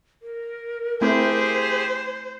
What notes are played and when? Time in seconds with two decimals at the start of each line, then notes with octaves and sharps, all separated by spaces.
0.22 A#4
1.01 A3 C4 E4 G4 G#4 C5